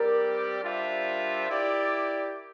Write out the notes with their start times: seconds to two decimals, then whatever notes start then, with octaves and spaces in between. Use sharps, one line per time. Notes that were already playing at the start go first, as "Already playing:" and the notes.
Already playing: G3 C4 G4 A#4 D5
0.63 G3 D4 F4 C5 E5
1.49 E4 G4 D5